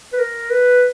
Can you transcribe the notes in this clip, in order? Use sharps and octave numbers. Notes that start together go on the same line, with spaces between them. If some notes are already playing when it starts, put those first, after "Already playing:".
B4
A#4
B4